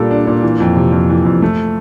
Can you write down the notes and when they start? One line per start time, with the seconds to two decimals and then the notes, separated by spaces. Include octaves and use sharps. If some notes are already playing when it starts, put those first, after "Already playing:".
Already playing: A#2 G3 D4 A4
0.11 D4
0.27 A#2
0.43 E3
0.60 F2
0.76 C3
0.92 F2
1.10 E3
1.25 F2
1.42 A3